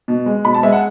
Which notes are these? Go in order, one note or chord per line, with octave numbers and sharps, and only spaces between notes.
B2
G#3
B2 B5
A5
G#3 E5
F#5